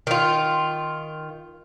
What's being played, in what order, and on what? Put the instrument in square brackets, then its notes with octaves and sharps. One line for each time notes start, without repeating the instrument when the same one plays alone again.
[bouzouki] D#3 F4